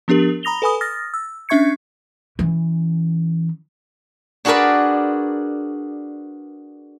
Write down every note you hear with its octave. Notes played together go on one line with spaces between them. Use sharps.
F3 B3 D4 G4 A#4 F#7
A#5 B5 D#6 A#6 F7 G7
A4 B4 G#5 B5 D#6
D#6 F6 A6 A#6
E6
C#4 D4 E5 C#6 G#6 C#7
E3 C#4
D4 F#4 G#4 A#4 B4 D5